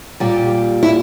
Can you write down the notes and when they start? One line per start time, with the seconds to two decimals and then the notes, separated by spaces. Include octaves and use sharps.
0.20 A#2 G3 G4
0.83 E4